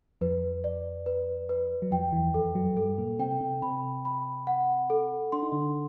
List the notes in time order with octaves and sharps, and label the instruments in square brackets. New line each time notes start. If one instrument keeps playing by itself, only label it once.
[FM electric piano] F2 F3 [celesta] B4
[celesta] D5
B4
B4
[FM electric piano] F#3
[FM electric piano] F2 F3 [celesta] G5
[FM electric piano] E2 E3
[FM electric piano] F2 F3 [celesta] A4
[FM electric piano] F#2 F#3
[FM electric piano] G2 G3 [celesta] A4
[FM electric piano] A#2 A#3
[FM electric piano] C3 C4 [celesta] G5
[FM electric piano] C3 C4
[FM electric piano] C3 C4 [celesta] B5
[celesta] B5
F#5
A4
[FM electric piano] D4 [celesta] C6
[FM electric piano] D#4
D3 D4